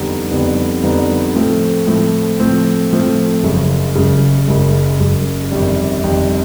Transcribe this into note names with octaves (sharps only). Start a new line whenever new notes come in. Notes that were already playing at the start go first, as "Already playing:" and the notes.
Already playing: F2 D3 G3 B3 D#4
F2 D3 G3 B3 D#4
F2 D3 G3 B3 D#4
A2 F3 A3 C4
A2 F3 A3 C4
A2 F3 A3 C4
A2 F3 A3 C4
F#1 F#2 C#3
F#1 F#2 C#3
F#1 F#2 C#3
F#1 F#2 C#3
G1 F2 C3 D#3 G3
G1 F2 C3 D#3 G3